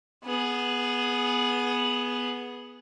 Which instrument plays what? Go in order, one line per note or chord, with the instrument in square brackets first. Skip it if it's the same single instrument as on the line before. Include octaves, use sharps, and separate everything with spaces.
[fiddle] B3 G#4